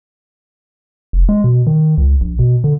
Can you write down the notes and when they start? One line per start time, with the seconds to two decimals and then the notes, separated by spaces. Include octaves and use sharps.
1.13 F1
1.29 G#3
1.44 B2
1.67 D#3
1.98 C#2
2.21 A#1
2.39 B2
2.64 D3